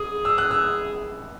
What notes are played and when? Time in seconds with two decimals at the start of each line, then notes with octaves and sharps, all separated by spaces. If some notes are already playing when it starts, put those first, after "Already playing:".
Already playing: G#4 D#6
0.25 E6
0.38 F#6
0.51 E6